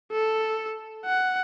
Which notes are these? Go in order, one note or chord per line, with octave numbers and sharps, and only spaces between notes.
A4
F#5